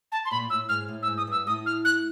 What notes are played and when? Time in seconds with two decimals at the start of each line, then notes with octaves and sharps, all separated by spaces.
0.12 A5
0.25 C6
0.31 A#2 B5
0.50 A2 E6
0.69 G#2 F6
0.88 A2
1.03 E6
1.07 G#2
1.18 D#6
1.27 G2 E6
1.47 A2 D#6
1.66 F6
1.85 F#6